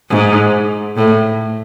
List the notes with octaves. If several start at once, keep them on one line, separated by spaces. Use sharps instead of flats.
G#2
A2